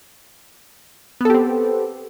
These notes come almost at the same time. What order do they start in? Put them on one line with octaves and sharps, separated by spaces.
B3 A4 G4 C4